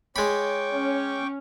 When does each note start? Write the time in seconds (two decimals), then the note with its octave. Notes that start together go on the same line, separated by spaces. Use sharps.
0.16 G#3 C#5 G5 B5 C#6 D6
0.73 C#4